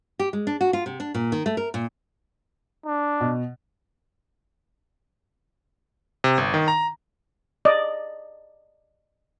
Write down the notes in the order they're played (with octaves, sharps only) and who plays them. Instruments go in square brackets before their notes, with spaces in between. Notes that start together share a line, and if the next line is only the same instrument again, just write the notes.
[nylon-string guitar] G4
G#3
D4
F#4
F4
C3
D4
A#2
D#3
A3
A#4
A#2
[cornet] D4
[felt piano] B2
[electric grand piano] C3
G1
D#3
A#5
[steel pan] D5 D#5